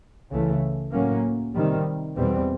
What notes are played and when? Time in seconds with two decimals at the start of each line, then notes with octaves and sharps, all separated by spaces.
0.30 C#2 C#3 E3 A3
0.92 A2 F#3 A#3 C#4
1.54 C3 D#3 G3
2.16 E2 B2 G3 C4